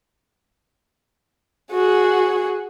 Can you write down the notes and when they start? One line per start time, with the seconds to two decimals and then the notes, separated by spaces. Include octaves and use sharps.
1.72 F#4 G#4